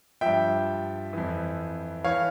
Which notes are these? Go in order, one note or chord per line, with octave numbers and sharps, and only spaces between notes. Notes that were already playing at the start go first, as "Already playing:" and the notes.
G2 F3 E5 G5
F2 E3
E3 C#5 F5